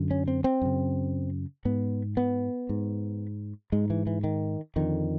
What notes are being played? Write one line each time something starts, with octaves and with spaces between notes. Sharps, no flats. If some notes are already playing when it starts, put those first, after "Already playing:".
Already playing: F#2 D3
C#4
C4
C4
F#2 C#3
G#2 B3
B3
G#2
G#2 G#3
E3
E3
D#3
F2 D3 D#3